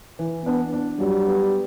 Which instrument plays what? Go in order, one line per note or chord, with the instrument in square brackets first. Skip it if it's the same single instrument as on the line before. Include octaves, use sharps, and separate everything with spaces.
[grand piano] E3
[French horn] B3 [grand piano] D4
[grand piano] D4
[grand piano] F#3 [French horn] G3
[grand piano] B3